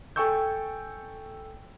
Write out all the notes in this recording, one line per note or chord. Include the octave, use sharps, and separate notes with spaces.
A4 G5 G#5 C#6 E6 G6